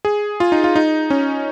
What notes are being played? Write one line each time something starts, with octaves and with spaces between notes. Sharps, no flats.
G#4
F4
D#4
F4
D#4
C#4